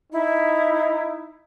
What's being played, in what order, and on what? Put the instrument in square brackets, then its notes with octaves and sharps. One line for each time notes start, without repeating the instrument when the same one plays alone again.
[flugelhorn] D#4 [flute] E4